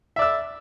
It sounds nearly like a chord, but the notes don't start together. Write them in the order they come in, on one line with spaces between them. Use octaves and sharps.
E5 D5 E6